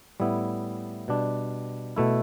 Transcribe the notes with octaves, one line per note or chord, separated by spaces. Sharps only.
A2 G3 B3 E4
B2 G3 D4
B2 A3 E4